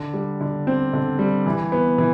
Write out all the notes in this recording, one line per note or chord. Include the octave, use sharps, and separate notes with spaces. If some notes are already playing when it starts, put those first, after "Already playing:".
Already playing: D3
G3
D3
C4
D3
G3
E3
B3
E3